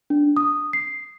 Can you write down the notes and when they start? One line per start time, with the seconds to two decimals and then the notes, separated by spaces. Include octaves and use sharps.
0.10 D4
0.37 D#6
0.73 C7